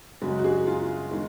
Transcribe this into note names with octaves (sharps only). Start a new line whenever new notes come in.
F#2 C#3 G#3 F#4
F#4
G#4
F4
D#3 G#3